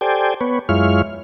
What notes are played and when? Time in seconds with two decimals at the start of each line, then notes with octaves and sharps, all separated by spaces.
0.01 G4 A4 C5 D5 G5 G#5
0.41 B3 B4 C#5
0.69 F#2 G#3 E4 F4 C#5 F6